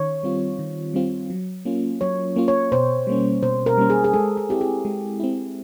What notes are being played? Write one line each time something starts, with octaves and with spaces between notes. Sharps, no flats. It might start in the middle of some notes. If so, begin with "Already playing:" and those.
Already playing: D#3 C#5
G3 C4 F4
D#3
G3 C4 F4
F#3
A#3 C#4 F4
F#3 C#5
A#3 C#4 F4
C#5
B2 C5
G3 A#3 C#4
B2 C5
A#4
G3 A#3 C#4
G#4
G#4
G#3 A4
G#4
C4 E4 G4
G#4
G#3
C4 E4